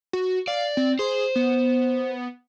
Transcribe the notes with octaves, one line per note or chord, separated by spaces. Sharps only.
F#4
D5 F5
C4
G#4 C5
B3